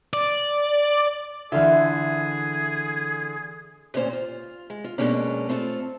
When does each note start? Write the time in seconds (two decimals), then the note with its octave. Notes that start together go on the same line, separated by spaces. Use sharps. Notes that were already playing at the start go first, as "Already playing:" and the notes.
0.13 D5
1.52 D3 E3 F4 G#4 E5
3.94 D2 A#2 C#4 E4 C5
4.13 F4
4.70 G#3
4.84 F4
4.98 F2 B2 G#3 A#3 C#4 D4
5.49 A3 C4 E4 F4 A4